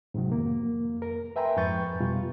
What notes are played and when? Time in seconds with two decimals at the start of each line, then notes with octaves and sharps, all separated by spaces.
0.14 G#2 C3 D#3 F#3
0.32 F2 A#3
1.02 A#4
1.36 B4 E5 G5 G#5 A#5 C6
1.57 F2 G#2 B4 C#6 G6 A6
2.00 B2 G3 F4